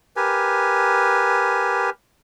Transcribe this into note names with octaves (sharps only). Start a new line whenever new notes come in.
G4 A#4 B4 G#5